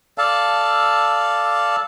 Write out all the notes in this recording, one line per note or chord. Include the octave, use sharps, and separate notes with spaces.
A4 D5 F5 A5